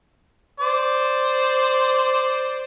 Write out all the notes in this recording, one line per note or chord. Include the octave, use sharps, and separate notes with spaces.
C5 D5